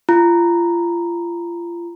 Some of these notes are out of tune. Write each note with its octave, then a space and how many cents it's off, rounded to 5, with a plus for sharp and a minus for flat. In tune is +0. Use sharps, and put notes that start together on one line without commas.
F4 -30 A#5 +0